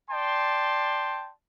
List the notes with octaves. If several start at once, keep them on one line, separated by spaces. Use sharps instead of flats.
D5 G5 A5 C6